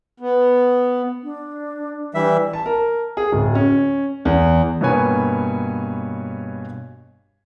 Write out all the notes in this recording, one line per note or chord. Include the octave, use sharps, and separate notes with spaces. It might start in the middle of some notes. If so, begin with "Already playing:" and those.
B3
D4
E3 G3 E5
A5
A#4
G#4
D1
C#4
E2
G2 B2 A#3 B4 C#5 G#5